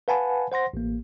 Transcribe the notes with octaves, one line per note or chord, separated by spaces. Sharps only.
B4 F5 F#5 G#5 A5 B5
C5 F#5 C6 A#6
A1 A#3